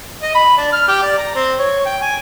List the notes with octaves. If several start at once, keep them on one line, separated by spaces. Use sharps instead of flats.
D#5
B5
D4
F6
G4
D5
A#5
C4
C#5
G5
G#5